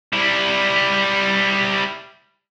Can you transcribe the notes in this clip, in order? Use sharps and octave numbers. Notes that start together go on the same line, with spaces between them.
G3 E4